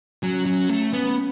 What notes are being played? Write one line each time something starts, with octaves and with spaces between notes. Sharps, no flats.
F#3 C#4
F#3
A3
B3